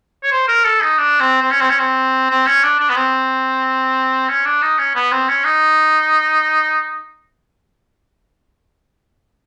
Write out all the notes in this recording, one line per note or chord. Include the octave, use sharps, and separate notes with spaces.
C#5
C5
A#4
A4
D#4
D4
C4
C4
C#4
C4
C#4
C4
C4
C#4
D4
D4
B3
C4
C#4
D4
D#4
C#4
B3
C4
C#4
D#4